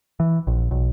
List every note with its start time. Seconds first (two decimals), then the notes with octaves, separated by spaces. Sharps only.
0.20 E3
0.47 A#1
0.71 B1